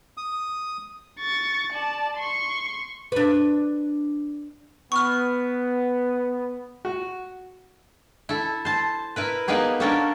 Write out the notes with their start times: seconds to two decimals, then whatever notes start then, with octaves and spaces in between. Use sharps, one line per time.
0.17 D#6
1.20 C#6 A6
1.72 D5 A5
2.17 C6 C#6
3.12 D4 B4
4.92 B3 C#6 F6
6.85 F#4
8.29 E4 A4
8.65 C5 A5
9.16 E4 A#4 B4
9.48 A#3 B3 D#4 G4 G#4
9.80 A#3 C#4 D4 A4 A#4 G5